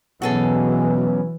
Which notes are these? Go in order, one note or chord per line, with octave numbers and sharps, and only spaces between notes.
B2 E3 F#3 B3 C#4 F#4 G#4 A4